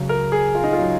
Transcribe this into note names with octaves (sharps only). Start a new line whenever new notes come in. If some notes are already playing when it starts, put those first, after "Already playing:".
Already playing: C#2 C#3 F#3
A#4
G#4
F4
D#4
F4
C#3 F#3